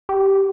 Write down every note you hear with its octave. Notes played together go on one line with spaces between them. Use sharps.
G4